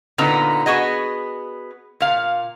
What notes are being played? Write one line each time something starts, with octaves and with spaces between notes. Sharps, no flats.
A#2 D3 B3 D#4 A#5
B3 F#4 G#4 D#5
A#2 F5